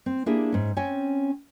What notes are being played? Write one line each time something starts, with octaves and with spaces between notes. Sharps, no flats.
C4
A#3 D4 E4 G4 G#4
G#2 C#4
C4 C#4 C#5 G5 G#5